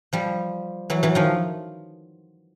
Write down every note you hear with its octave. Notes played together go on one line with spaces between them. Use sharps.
F3 G3
E3 F#3
E3 F#3
D#3 F3